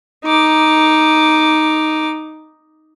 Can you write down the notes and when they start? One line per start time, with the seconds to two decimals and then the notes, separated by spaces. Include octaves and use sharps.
0.25 D#4 D6